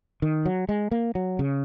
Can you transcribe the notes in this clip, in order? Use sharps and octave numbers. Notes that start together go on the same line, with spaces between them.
D#3
F#3
G#3
A#3
F#3
C#3